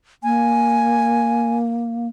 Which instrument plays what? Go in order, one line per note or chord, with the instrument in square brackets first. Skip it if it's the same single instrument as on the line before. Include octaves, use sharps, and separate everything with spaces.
[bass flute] A#3 [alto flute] G#5